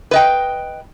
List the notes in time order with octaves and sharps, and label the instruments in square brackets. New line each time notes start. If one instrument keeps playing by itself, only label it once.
[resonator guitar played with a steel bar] B4 D#5 G5